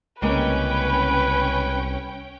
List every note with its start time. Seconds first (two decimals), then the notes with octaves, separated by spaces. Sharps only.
0.22 C2 C#3 G#3 A#3 C#4 B4 G5